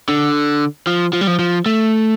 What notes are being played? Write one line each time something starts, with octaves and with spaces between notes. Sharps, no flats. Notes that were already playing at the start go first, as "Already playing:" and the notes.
D3
F3
F3
G3
F3
F3
A3